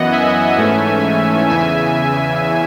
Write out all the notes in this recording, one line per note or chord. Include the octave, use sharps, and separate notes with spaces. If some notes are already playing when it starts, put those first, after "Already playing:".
Already playing: F#2 E3 B3 D#5 F#5
E5 G#5
G#2 E3 A3 C#4
E2 C#3 E3 E5 G#5